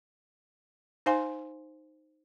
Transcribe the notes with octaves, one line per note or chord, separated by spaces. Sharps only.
D#4 C5 F5 G#5 C6